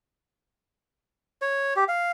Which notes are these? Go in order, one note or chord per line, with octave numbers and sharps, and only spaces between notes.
C#5
G4
F5